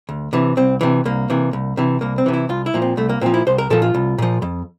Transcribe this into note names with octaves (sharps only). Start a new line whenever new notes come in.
D2
C3 E3
C2 C4
C3 E3
C2 A#3
C3 E3
C2
C3 E3
C2 A#3
C4
C3 E3
E4
C2 F4
E4
A#2 F3
C4
C2 A3
A#3
A#2 F3 C4
E4
C2 C5
A#4
A#2 F3 A4
F4
C2
A#2 F3
F2